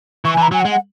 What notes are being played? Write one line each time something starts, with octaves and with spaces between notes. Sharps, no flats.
E3 C#6
G#5
E3
A#5
F#3 G#5
F#5
G#3
F#5